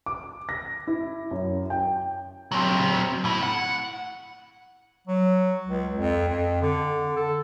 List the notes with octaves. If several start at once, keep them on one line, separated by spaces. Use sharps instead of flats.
D6
A#6
E4
F#2
G5
F#3 C4
A2 E4
F#5
F#3
C#2
F2
F2
D3
A4